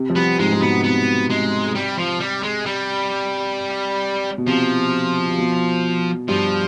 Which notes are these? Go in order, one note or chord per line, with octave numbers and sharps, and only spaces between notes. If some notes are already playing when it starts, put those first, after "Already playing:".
Already playing: C3
F3
G3 B3
G#2 G#3
G#2
B2 B3
C3 B3
G#3
G3
F3
G3
G#3
G3
B2
C3 F3
C3
B2
G2 F3